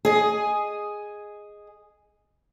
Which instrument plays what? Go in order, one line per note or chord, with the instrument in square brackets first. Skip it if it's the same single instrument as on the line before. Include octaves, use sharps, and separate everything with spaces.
[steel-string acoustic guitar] G#4 D#5